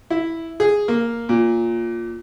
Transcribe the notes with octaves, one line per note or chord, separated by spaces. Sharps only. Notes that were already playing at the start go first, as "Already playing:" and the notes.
E4
G#4
A#3
A#2